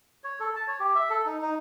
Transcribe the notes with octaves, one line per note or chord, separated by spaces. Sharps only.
C#5
A4
A5
C#5
G4
E5
A4
D#4
D#4